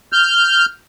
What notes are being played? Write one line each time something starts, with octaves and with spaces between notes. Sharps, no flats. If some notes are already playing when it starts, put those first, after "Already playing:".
F6 G6